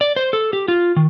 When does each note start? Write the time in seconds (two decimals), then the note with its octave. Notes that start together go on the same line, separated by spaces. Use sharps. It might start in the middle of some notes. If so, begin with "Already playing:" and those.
0.01 D5
0.16 C5
0.33 A4
0.53 G4
0.68 F4
0.96 D#3